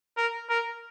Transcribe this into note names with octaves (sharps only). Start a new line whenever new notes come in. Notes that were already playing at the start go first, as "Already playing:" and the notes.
A#4
A#4